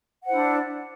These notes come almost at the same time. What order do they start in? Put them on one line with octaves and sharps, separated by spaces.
F#5 C5 E4 D4